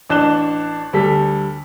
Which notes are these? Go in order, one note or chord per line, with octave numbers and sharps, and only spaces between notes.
A1 D4 F#6 E7 G7
D2 G3 A4 B6